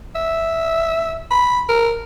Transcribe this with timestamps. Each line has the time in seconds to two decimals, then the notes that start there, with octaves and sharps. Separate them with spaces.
0.15 E5
1.31 B5
1.69 A#4